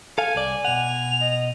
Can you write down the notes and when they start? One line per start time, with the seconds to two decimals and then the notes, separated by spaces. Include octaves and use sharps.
0.18 A4 F5 G#5
0.35 C2 D5
0.65 B2 F#5 F7
1.21 D#5